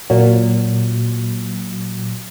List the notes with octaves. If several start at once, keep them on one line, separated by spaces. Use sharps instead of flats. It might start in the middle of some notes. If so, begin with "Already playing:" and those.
A#2 F#3